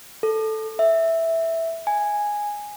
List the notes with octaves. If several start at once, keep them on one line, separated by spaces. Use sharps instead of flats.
A4
E5
G#5